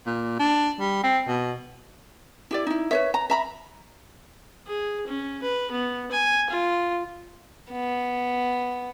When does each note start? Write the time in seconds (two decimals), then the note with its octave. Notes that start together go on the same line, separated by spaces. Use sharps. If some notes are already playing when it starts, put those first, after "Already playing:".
0.06 A#2
0.39 D4
0.80 G3
1.03 C4
1.28 B2
2.51 E4 G4 D5
2.67 D#4 E4
2.91 B4 C#5 E5
3.14 A#5
3.30 E5 A#5 B5
4.67 G#4
5.07 C#4
5.42 B4
5.71 B3
6.11 G#5
6.50 F4
7.72 B3